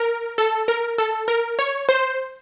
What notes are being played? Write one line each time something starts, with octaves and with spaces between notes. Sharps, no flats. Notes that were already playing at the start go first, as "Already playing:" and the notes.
Already playing: A#4
A4
A#4
A4
A#4
C#5
C5